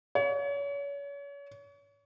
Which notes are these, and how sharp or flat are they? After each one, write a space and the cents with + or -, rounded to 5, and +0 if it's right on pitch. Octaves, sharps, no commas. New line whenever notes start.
C#5 +35